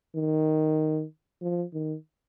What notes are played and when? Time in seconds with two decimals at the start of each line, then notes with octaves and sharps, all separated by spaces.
0.15 D#3
1.42 F3
1.73 D#3